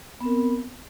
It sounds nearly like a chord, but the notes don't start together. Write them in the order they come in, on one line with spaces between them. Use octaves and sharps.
B3 C4 A#4